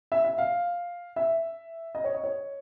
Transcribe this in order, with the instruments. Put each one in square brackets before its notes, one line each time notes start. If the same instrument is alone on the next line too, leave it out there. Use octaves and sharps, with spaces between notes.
[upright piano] E5
E5
F5
E5
D#5
C#5
D#5
C#5